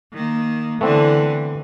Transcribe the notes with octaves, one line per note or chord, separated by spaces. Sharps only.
D#3 A#3
D3 E3 A3 B3 C4